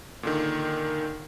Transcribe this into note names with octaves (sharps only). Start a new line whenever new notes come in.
A#2 D3 D#3